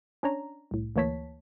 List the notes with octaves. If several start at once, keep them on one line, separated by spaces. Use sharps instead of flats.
C#4 D4 C#5 A#5
C2 A2
D2 E3 A#3 C#5 A5 B6